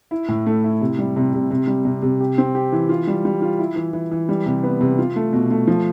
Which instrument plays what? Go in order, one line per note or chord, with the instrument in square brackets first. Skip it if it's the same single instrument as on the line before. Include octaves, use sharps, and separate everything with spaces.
[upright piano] E4
A2
A3
E4
C3
G3
C3
C3
C3
G3
C3
C3
G4
C4
G4
E3
F4
G3
G3
F4
E4
E3
E3
E3
G3
C3
B3
C3
F4
A3
B2
A3
F3